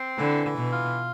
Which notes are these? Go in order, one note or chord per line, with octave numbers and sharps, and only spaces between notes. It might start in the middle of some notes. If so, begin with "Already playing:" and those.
Already playing: C4
D3 E3
E3
B2
F4